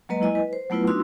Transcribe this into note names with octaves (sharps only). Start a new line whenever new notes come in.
F#3 G#3 A#3 B4 D#5 A#5
E4 D#5 G#5
B4
C5
F#3 A3 B3 E4 F4 B4
D4 D#4 F#4 C6 E6